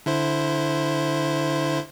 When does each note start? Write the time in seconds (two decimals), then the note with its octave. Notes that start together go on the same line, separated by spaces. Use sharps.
0.06 D3 E4 C5